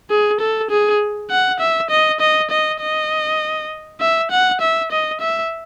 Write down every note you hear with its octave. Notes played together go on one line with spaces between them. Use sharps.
G#4
A4
G#4
F#5
E5
D#5
D#5
D#5
D#5
E5
F#5
E5
D#5
E5